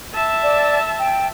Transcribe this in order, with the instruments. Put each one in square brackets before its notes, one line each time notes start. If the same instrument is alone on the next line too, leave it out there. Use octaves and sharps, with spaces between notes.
[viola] E5 A5
[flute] D5
G5